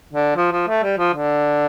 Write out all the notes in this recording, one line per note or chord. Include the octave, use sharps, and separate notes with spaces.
D3
F3
F3
A3
G3
F3
D3